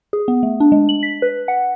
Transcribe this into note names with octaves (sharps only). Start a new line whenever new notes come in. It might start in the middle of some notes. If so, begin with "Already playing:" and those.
G#4
B3
A3
D4
G#3
F#7
B6
B4
F#5